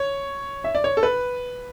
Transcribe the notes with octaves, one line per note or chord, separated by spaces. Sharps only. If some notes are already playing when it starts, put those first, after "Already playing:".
Already playing: C#5
E5
D5
C#5
A4
B4